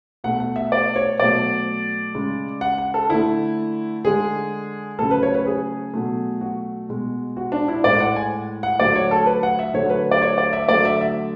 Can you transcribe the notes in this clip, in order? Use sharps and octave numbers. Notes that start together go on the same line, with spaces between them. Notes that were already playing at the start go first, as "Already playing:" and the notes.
B2 A3 F#5
F#5
E5
D5
C#5
B2 F#3 A3 D5
C#3 G#3
F#5
F#5
A4
D3 A3 E4
D3 G#3 G#4
C#3 F#3 A3 A4
B4
C#5
B4
G#4
B2 F#3 A3
F#4
B2 G#3
F#4
D4
E4
A2 G#3 D5
F#5
G#5
F#5
D3 F#3 A3 D5
C#5
A4
B4
F#5
E5
D3 F#3 A3 C#5
B4
D5
C#5
D5
E5
D3 F#3 A3 D5
E5
E5